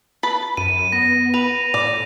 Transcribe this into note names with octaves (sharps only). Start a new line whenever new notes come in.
B4 A5 B5
F#2 D#7
B3 A#6
B4 F7
A2 D5